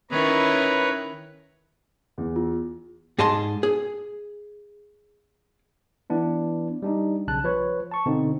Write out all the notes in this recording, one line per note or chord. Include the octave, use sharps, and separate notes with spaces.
D#3 C#4 E4 B4 C#5 A#5
E2
F4
G#2 G#4 D#5 A5 C6
G#4
E3 B3 D4 E4
G3 D4 D#4
B1 C#3 A5 F#6
F3 B4 C#5
A5 C#6
B2 D3 C4 D#4